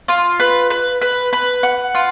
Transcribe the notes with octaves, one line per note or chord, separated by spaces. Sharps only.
F4
B4
B4
B4
B4
F#5
F4